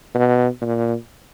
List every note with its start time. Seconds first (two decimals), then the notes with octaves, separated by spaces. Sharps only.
0.15 B2
0.62 A#2